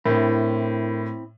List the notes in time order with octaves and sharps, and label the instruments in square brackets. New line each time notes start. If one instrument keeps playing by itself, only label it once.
[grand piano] A2 [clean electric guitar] C4 E4 [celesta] D4 A#4